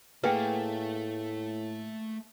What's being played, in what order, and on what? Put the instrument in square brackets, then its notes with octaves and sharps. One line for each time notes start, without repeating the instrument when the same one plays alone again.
[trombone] A2 [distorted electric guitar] A3 [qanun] A#3 G#4 [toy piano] B4 F#5 G5